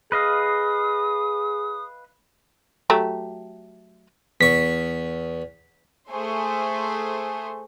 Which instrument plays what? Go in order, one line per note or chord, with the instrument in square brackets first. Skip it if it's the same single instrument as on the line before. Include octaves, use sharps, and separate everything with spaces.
[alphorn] G#4 [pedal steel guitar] B4 D#5 F5 [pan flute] D#6
[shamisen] F#3 A3 G4
[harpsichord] E2 C#6 [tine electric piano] B6
[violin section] A3 G#4 C5